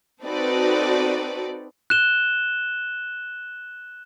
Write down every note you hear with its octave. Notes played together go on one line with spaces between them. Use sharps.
C4 D#4 F#4 A4 B4 D5
F#6 E7 G7